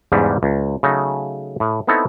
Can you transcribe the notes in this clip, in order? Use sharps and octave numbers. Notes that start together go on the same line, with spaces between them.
E2 G#2 C#3 G3 D4
C#2
C#3 F#3 A3 D#4
A2
B3 C4 D#4 E4 A4 C#5